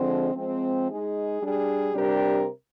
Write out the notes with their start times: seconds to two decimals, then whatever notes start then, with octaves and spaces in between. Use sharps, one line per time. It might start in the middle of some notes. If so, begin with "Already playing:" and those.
Already playing: D3 F3 G#3 C4
0.36 F3 G#3 C4
0.89 G#3 D#4 G#4
1.41 G3 D4 G#4
1.93 C3 G3 D4 G4 A#4